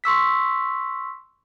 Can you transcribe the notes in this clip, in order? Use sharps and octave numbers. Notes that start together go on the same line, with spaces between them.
C6 C#6 E6 B6